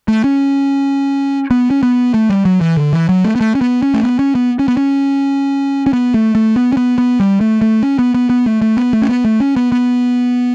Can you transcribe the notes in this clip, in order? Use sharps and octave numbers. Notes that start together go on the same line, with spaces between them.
A3
C#4
B3
C#4
B3
A3
G3
F#3
E3
D3
E3
F#3
A3
B3
A3
C#4
B3
C#4
A3
B3
C#4
B3
C#4
B3
C#4
C#4
B3
A3
A3
B3
C#4
B3
B3
G3
A3
A3
C#4
B3
B3
B3
A3
A3
B3
A3
C#4
B3
A3
C#4
B3
B3